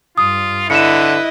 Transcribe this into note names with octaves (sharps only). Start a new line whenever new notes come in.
G2 F4 D#6
D3 E4 B4 D#5 C#7 E7